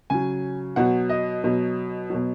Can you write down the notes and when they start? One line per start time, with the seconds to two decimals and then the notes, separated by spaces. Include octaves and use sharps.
0.10 C#3 F#3 G#5
0.76 B2 F#3 F#5
1.09 D#5
1.44 B2 F#3
2.10 B2 F#3